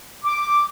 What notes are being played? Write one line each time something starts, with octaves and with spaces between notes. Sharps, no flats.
D6